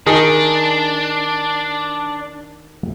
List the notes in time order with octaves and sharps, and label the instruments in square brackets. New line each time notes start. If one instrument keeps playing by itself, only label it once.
[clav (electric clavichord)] D#3 D#4 G#4 [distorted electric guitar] D4